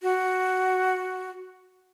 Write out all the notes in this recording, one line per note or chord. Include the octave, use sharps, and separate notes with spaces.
F#4